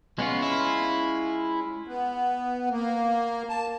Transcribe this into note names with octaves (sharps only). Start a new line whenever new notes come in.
G#3 B3 C#4 F4
E4
B3
A#3
A5